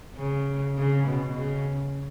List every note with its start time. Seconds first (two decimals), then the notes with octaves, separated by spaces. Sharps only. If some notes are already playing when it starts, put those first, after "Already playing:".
0.16 C#3
0.78 C#3
1.07 B2
1.37 C#3